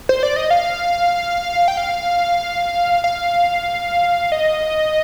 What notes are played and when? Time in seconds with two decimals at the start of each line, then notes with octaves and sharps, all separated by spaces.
0.09 C5
0.23 D5
0.36 D#5
0.50 F5
1.68 G5
1.77 F5
3.04 F5
4.32 D#5